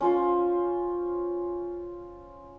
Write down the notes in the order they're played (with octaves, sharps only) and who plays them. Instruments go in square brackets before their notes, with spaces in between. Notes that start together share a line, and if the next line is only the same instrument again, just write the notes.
[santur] C#4 F4 C5